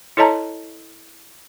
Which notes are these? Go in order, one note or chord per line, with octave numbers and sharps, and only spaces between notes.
E4 A4 C#5 D#5 A5 A#5